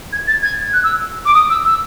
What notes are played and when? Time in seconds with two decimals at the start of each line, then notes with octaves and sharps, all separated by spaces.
0.13 G#6
0.27 A6
0.43 G#6
0.73 F#6
0.84 E6
1.26 D6
1.34 D#6
1.50 E6
1.65 E6